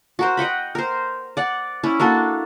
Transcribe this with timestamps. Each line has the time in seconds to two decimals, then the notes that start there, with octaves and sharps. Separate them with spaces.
0.19 F#4 A#4 C5
0.37 D#5 F#5 G5 B5
0.75 A#4 C5
1.37 D5 F#5
1.84 C#4 E4
2.00 A#3 D4 F#4 A4